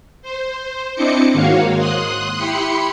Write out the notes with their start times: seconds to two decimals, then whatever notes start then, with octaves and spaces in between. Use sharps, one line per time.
0.22 C5
0.95 C4 D4 E4 D#5 D6 C#7
1.32 G#2 D#3 A#3 F#4 C#5 F5
1.77 C6 D#6 F#6
2.37 E4 G4 B5 C6 C#7